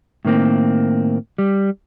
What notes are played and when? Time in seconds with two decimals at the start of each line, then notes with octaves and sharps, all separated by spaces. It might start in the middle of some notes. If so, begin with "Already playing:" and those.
0.25 A2 D#3 A#3 C4
1.38 G3